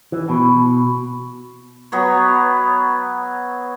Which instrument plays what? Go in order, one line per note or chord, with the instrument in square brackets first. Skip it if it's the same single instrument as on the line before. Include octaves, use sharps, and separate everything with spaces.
[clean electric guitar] E3
B2
[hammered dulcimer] F#3 B3 C#5